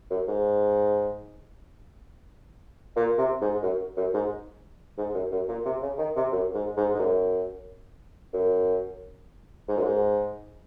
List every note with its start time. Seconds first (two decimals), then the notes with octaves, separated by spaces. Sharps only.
0.10 F#2
0.28 G#2
2.96 A#2
3.18 C3
3.41 G#2
3.63 F#2
3.97 F#2
4.14 G#2
4.98 G#2
5.15 F#2
5.32 F#2
5.48 A#2
5.65 C3
5.82 C#3
5.98 D#3
6.16 C3
6.32 F#2
6.54 G#2
6.77 G#2
6.95 G#2
6.99 F#2
8.33 F#2
9.68 G#2
9.77 F#2
9.85 G#2